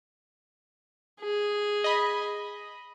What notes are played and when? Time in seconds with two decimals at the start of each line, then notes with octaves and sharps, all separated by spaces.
1.21 G#4
1.84 D#5 B5